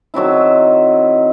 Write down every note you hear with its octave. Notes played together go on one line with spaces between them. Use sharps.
D#3 F#3 C4 E4